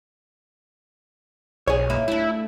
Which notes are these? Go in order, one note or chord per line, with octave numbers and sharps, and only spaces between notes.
B1 G#4 C#5
A#3 D#4 E4
A3 D4 E4